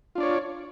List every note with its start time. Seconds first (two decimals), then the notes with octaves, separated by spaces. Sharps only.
0.15 F4
0.18 D4
0.20 D5
0.23 C#5